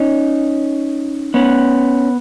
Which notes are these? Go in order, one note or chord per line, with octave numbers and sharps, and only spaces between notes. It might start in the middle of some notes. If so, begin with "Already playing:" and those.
Already playing: C#4 D#4
B3 C#4